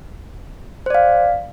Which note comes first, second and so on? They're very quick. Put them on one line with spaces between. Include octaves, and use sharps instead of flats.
C5 D5 F5